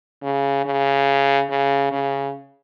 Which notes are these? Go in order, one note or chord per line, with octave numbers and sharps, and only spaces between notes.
C#3
C#3
C#3
C#3